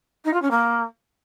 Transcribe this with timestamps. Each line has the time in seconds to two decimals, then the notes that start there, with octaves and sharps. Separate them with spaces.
0.24 D#4
0.33 F4
0.42 C#4
0.50 A#3